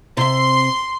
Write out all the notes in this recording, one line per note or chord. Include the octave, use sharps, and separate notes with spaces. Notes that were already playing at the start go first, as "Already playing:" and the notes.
C3 E5 C6